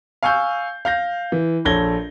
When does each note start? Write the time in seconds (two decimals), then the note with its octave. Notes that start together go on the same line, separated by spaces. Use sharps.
0.23 F5 G#5 C#6 E6 G6
0.85 F5 G6 A#6
1.32 E3
1.65 A#1 A4 C#5 G#6 A#6 G7